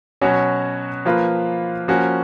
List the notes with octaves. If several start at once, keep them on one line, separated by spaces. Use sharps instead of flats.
B2 F#3 C#4 F#4 C#5
F3 A#3 F4 B4
F3 A#3 C#4 F#4